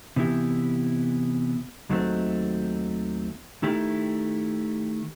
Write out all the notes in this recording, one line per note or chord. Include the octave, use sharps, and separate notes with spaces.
C3 E3 B3 E4 G4
D#2 D#3 F#3 A3 C4
D#3 A3 E4 G4